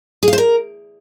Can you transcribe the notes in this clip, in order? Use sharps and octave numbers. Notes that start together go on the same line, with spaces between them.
G#4
F5
C5
A#4